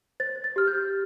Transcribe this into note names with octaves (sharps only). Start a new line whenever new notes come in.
C5 A6
A6
G4 F6
G6